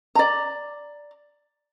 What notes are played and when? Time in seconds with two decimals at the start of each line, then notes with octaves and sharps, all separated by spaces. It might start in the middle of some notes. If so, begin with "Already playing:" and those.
0.15 D5 A#5